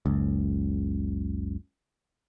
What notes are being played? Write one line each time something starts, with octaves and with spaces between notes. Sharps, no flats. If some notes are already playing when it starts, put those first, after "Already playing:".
F#1 C#2